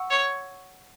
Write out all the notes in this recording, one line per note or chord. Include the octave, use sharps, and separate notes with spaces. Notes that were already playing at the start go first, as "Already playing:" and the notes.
Already playing: F#5 C#6 E6
C#5